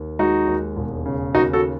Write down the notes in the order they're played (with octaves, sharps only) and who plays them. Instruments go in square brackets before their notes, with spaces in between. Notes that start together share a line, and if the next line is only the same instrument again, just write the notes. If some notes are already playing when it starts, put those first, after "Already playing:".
Already playing: [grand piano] D#2
G#3 D#4 F#4
D#2
E1
C#3
D#2 D#4 F#4
F#4 A4